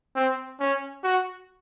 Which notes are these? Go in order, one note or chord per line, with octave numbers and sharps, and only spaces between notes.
C4
C#4
F#4